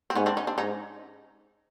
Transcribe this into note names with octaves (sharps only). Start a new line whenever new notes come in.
C4
G#2 B3 C#4
C4 D4
C#4 D#4
C4 D4
G#2 C#4 D#4